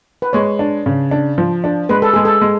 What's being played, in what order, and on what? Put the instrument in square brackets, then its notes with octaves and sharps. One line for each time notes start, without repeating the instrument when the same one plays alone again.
[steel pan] B4
[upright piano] G#3 [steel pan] C#5
[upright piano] D4
C#3
D4
F3
D4
[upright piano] G#3 [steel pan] B4
[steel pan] A4
[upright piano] G#3 [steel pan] G#4
[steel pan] A4
[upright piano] G#3